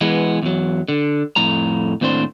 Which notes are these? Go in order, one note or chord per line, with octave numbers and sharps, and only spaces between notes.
E3 G#3 B3
E2 F#3
D3
F2 A2 A#5
D#2 A2 C4 D4 C5